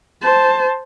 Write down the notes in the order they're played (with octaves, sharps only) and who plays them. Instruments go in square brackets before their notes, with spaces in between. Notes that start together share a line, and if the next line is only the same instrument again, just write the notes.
[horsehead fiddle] C5 A5